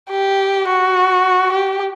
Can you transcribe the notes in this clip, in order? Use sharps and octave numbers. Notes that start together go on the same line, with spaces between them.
G4
F#4
G4